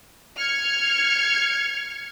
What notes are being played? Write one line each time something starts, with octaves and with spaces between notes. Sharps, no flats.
F6 G#6 C#7